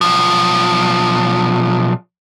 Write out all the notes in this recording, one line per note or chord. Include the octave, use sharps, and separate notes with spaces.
B1 F3